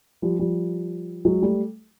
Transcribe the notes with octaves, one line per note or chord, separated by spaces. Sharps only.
F3 G3
F3 G3
F#3 G#3
G3 A3